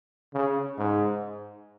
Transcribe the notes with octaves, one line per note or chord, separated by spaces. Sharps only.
C#3
G#2